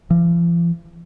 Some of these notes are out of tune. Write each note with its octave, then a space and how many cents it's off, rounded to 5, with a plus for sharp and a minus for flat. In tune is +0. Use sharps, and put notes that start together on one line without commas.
F3 -45